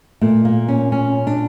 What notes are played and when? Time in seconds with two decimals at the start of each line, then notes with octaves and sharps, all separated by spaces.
0.21 A#2 A3
0.45 A#3
0.68 C#4
0.92 C#4
1.27 D4